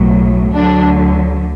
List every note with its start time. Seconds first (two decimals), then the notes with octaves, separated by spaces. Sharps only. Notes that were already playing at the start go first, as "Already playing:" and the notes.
Already playing: B1 A2 F#3
0.55 D2 D3 F#3 D4